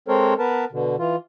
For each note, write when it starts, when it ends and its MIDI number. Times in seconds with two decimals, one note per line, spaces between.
0.08 0.34 56
0.08 0.34 60
0.08 0.34 69
0.08 0.34 70
0.08 0.34 72
0.08 0.34 73
0.39 0.65 59
0.39 0.65 70
0.39 0.65 71
0.39 0.65 81
0.72 0.96 47
0.72 0.96 50
0.99 1.16 52
0.99 1.16 65